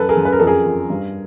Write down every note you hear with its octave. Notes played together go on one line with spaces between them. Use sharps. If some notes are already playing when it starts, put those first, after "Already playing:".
Already playing: F#2 A4 B4
G#4 A#4
F#2
B4
A#4
F2 A4
G#4 A#4
F2
G2